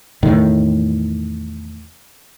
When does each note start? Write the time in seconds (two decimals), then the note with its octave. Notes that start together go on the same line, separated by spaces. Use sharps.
0.23 E2 A2 D#3